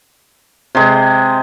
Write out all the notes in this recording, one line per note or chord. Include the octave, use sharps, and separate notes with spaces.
C3 G#3